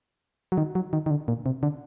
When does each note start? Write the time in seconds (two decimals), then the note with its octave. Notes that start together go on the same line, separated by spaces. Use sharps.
0.52 F#3
0.58 D#3
0.75 F#3
0.93 D#3
1.06 D#3
1.10 D3
1.28 A#2
1.46 C3
1.63 D3